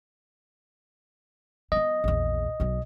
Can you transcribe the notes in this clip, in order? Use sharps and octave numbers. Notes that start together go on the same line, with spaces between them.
F#3 B3 D#5
A#1 E2
B1 F#3